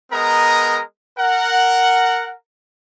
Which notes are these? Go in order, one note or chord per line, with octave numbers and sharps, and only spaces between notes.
G#3 B3 A#4 D#5 A#5
A#4 F#5